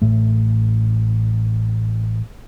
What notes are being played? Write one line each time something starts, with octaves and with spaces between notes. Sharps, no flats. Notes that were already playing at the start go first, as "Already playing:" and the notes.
A1 A2 A3